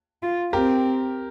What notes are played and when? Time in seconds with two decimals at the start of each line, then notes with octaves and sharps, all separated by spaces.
0.23 F4
0.53 C4 G4 A#4